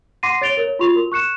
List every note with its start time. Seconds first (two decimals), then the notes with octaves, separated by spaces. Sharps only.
0.23 F#5 C6 D6 A#6 C7 D#7
0.41 C#5 A6 D7 F7 G7
0.57 A#4 C#5
0.79 F4 F#4 C6 C#6 F7
0.96 A#4
1.12 C#6 F#6 C#7 E7